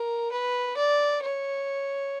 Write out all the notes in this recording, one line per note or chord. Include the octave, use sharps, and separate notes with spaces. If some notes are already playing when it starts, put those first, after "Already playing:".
Already playing: A#4
B4
D5
C#5